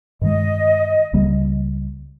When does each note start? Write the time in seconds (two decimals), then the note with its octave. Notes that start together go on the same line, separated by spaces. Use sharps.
0.21 G2 D#3 G#3 D#5
1.13 C#2 C#3 G3 A#3